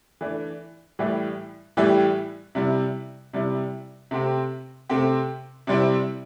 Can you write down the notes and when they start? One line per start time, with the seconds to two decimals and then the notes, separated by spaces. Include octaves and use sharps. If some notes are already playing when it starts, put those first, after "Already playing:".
0.21 E3 A3 D4
0.99 A2 E3 G3 E4 G4
1.77 A2 E3 G3 E4 G4
2.55 C3 G3 E4
3.33 C3 G3 E4
4.11 C3 A3 C4 G4
4.89 C3 A3 C4 G4
5.67 C3 G3 C4 E4